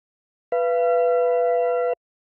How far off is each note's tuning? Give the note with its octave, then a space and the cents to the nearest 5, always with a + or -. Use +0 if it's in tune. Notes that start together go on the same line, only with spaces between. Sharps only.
B4 +0 F5 -40